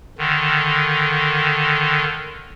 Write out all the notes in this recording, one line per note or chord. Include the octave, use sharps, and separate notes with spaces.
D3 D#3